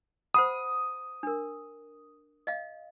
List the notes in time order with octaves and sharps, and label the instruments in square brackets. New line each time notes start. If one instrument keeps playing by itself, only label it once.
[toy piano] C5 F#5 B5 [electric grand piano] D#6
[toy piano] D4 A#4
D#5 F5